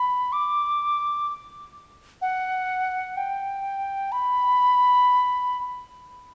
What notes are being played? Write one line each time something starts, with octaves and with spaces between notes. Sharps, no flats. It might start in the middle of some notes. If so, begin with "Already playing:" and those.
Already playing: B5
D6
F#5
G5
B5